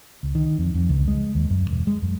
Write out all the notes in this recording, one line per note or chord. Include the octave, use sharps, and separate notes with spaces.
C#2
D#3
F2
F2
C#2
G#3
D#2
F#2
E1
G#3
F#2